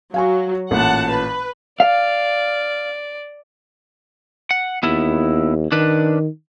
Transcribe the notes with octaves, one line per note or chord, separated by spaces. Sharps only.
F#3 F5 G#5 C#6
A1 A#2 F#5 A5
B4
D5 F5
F#5
D#2 B3 E4
D#3 D4 B4